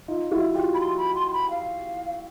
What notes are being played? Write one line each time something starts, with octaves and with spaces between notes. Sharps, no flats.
D#4 F4
E4 F#4
F4 G4
B5
C6
B5
C6
C6
B5
F5